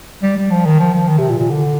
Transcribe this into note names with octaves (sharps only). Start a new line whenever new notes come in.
G3
G3
F3
D#3
F3
F3
D#3
C3
A#2
A#2
D3